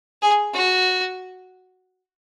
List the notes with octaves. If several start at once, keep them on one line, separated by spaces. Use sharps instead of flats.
G#4
F#4